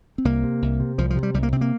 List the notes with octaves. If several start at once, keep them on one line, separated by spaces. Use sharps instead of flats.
C4
C2 A#3
C3
C2
C3
C2 F3
F3
C3
G3
C2 G3
A#3
C3 C4
A#3